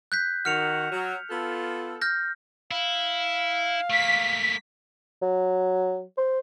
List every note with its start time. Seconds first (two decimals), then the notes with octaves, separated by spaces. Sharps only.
0.12 F#6 G6 B6
0.45 D#3 F#4 F6 C#7 F7
0.91 F#3
1.30 B3 F4 A4
2.02 F6 G6 A#6
2.71 E4 F5
3.90 A3 A#3 B6
5.22 F#3
6.17 C5